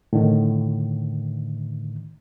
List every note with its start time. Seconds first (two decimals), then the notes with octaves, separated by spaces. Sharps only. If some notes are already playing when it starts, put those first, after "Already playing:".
0.13 A2 D3 D#3